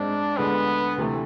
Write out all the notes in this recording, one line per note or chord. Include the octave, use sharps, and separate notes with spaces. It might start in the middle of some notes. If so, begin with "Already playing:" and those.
Already playing: G#2 G#3 C4 D4
D2 D3 G#3 B3
D2 C3 E3 A3